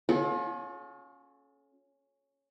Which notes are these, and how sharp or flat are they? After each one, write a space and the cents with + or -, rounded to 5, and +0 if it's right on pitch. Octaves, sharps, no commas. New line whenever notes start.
C#4 +0 F4 +40 A4 -40